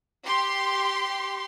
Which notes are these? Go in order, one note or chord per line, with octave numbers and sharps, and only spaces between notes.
G4 C6